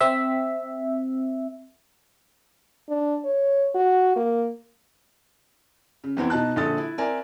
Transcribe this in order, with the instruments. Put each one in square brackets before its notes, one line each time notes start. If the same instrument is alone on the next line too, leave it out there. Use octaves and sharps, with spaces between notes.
[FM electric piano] C4 E5
[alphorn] D4
C#5
F#4
A#3
[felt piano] C#3
E2 B3 C4 E4
B2 D#4 A5 F#6
A#1 D3 A4 D#6 A6
E4
C4 A#4 D5 E5 G#5